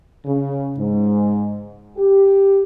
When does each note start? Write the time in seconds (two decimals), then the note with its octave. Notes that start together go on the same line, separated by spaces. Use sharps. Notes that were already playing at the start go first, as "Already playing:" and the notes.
0.26 C#3
0.78 G#2
1.97 G4